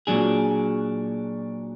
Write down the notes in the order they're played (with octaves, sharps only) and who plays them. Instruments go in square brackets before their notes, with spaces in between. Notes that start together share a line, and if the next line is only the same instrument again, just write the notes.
[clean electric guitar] A#2 F#3 D4 G#4